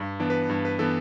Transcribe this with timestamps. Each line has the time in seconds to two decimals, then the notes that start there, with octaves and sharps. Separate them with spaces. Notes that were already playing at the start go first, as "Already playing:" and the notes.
Already playing: G2
0.20 E3 B3 D4
0.30 B4
0.49 G2
0.65 B4
0.79 E3 B3 D4 A4